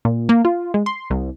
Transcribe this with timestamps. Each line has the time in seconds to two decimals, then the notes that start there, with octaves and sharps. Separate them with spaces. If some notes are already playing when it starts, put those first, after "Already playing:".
0.05 A#2
0.29 A#3
0.45 F4
0.74 G#3
0.86 C6
1.10 C2